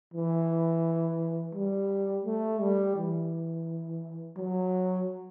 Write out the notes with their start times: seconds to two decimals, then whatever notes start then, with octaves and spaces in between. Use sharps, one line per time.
0.14 E3
1.55 G3
2.25 A3
2.60 G3
2.96 E3
4.37 F#3